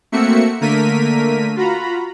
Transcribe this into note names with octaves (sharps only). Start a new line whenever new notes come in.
A3 A#3 C4 F#4 E5 C#7
D3 A3 A#3 A#4 B6 D#7
F4 F#4 A#5 B5